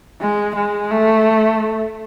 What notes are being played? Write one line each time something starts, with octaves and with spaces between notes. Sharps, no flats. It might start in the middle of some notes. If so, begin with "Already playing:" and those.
G#3
G#3
A3